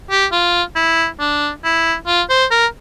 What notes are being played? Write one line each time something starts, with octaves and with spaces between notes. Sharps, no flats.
G4
F4
E4
D4
E4
F4
C5
A#4